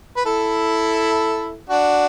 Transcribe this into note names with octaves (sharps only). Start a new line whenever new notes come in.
B4
E4 A4
D4 F#4